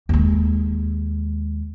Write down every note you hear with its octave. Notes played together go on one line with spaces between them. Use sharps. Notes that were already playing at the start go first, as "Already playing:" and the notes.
D#2 G#3